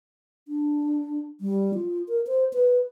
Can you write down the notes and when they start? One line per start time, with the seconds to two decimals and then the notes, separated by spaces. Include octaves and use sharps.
0.48 D4
1.41 G3
1.75 F4
2.08 A#4
2.27 C5
2.53 B4